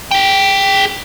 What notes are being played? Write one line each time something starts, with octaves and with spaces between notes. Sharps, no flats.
G#4 G5